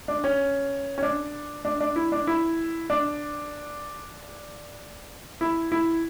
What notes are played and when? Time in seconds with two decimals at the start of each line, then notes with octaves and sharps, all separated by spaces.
0.08 D4
0.24 C#4
0.98 C#4
1.02 D4
1.65 D4
1.81 D4
1.96 E4
2.12 D4
2.27 E4
2.90 D4
5.41 E4
5.72 E4